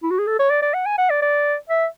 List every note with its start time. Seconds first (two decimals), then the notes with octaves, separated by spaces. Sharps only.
0.03 E4
0.11 F#4
0.19 G#4
0.27 A4
0.39 C#5
0.50 D5
0.63 D5
0.74 F#5
0.86 G#5
0.98 F#5
1.10 D5
1.22 D5
1.69 E5